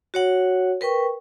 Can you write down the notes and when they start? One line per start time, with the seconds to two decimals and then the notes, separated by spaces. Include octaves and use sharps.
0.14 F#4 C#5 F#5
0.81 A#4 B4 G5 C#6